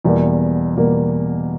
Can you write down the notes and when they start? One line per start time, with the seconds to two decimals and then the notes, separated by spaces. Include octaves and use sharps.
0.04 E2 B2 G3 A#3
0.75 E2 B2 G3 A#3